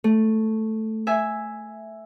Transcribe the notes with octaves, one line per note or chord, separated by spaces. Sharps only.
A3
E5 G#5